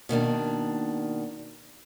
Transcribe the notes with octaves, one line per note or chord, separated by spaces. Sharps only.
B2 D#3 A#3 D4